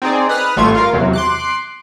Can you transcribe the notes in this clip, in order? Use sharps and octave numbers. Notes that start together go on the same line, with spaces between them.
C4 D#4 G#4 D5
B4 D#6 F6 F#6
A1 G3 A3 F4 C#6 G#6
F4 A#4 F5
E2 C3 F#3
C6 D6 F#6